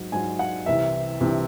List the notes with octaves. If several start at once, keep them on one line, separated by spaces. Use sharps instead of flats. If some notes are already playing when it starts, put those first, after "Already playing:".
Already playing: G#2 F#3
G#2 F#3 G#5
F#5
C2 C3 E3 E5
C2 C3 E3